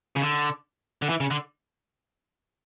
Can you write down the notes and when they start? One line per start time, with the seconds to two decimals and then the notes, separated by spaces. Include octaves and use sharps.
0.16 C#3
0.22 D3
1.02 D3
1.09 E3
1.20 C#3
1.31 D3